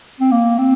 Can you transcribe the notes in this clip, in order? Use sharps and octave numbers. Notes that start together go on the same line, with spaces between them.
C4
A#3
C4